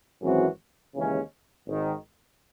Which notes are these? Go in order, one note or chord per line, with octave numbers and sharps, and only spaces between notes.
G#1 F#2 E3 C4 F#4
D#2 C#3 E3 G#3 C#4
G#1 G#2 D#3